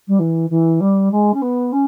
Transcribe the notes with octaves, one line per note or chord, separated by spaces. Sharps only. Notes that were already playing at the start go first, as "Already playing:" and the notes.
G3
E3
E3
G3
G#3
C#4
B3
C#4